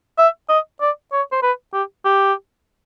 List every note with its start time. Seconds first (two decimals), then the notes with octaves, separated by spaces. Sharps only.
0.18 E5
0.49 D#5
0.81 D5
1.12 C#5
1.32 C5
1.42 B4
1.73 G4
2.05 G4